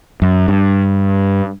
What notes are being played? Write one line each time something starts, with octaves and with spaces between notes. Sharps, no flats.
F#2
G2